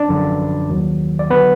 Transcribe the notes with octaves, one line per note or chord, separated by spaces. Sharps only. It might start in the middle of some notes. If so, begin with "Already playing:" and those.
Already playing: D4 D5
G#1 F#2 D3 F3
D#2 D#3 F#3
D5
D3 F#3 B3 B4